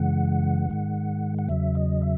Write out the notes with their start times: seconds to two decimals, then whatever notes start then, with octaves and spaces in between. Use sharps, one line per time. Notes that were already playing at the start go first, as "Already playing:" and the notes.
Already playing: F#2 C#3 E3 G#3 F#5
0.70 G#2 D#3 G#3
1.39 F#5
1.49 E2 C#3 F#3 E5
1.75 D#5
2.02 E5